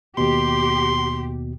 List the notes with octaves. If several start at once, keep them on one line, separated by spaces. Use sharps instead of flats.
D#2 B2 G4 C6